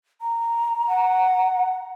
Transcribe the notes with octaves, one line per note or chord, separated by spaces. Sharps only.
A#5
F#5